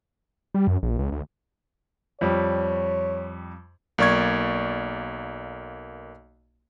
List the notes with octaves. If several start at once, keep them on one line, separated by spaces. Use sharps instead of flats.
G3
F#2
A#1
C#2
D2
F2 G3 C#5
B1 A#3 D5 C#6 G#6